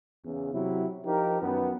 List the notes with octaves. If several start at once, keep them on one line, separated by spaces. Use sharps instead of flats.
E2 C#3
C3 F#3 E4
F3 D#4 G4 A#4
F#2 D#3 B3